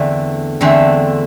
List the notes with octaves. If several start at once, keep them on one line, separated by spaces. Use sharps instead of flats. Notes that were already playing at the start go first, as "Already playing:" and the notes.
Already playing: E2 D3 A3 C4
E2 D3 A3 C4